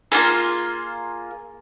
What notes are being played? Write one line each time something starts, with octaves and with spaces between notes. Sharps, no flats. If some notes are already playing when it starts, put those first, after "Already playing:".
A#3 D4 F4 G#4